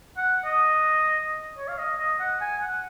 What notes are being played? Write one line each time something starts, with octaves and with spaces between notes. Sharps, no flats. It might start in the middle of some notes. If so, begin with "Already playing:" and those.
F#5
D#5
C#5
F5
D#5
D#5
F#5
G#5
F#5